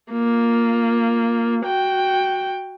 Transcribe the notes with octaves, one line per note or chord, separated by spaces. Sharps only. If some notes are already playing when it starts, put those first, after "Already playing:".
A#3 F4
F#4 G5